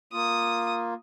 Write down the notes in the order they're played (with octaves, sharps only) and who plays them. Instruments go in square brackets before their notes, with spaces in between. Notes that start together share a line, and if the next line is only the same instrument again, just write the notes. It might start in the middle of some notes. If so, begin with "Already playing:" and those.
[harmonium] A#3 F4 [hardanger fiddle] D#6